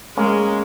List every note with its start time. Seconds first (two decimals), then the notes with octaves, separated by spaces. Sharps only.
0.17 G#3 A#3 C#4